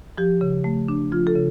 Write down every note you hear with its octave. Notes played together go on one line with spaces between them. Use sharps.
F3 G4
C#3
A3
D4
F3 F4
A4
C#3